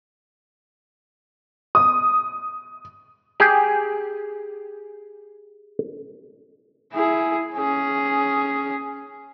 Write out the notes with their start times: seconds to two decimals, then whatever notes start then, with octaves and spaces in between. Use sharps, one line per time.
1.75 D#6
3.40 G4 G#4
6.93 E4 G#4
7.56 C#4 G#4